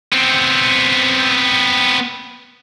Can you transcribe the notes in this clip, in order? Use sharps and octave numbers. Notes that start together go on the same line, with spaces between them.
B3 C4